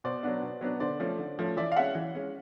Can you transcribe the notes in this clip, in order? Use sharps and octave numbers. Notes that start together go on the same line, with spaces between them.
B2 C5 D5
F#3 B3 D4
B2
F#3 B3 D4
D3 C5 D5
F3 A3 C#4
D3
F3 A3 C#4
E3 D5 E5
F5
G#3 C#4 E5 F#5
E3
G#3 C#4